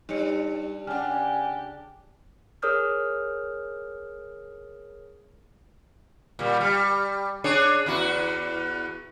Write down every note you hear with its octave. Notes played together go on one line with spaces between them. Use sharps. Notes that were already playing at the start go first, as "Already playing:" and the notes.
G2 G3 D#4 C#5 C#7
C#3 D4 G4 F#5 G#5 F6
G#4 A#4 C#5 D#6 F6 G6
A#2 G3
G3
D4 G#4 C#5
E2 E4 F#4